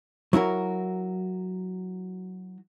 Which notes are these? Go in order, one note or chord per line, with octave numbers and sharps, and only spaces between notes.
F#3 E4 F#4 A#4